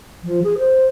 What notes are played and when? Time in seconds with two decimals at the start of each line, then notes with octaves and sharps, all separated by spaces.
0.24 F3
0.44 G#4
0.58 C5